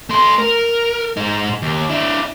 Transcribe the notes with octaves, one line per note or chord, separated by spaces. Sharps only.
A3 C6
A#4
G#2 D#4
D#2
D4 E4